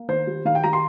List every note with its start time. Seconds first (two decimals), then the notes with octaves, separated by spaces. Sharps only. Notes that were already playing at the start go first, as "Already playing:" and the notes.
Already playing: A#3
0.08 D#3 C5
0.27 G3
0.45 D#3 F5
0.55 G5
0.63 G3 A#5
0.73 C6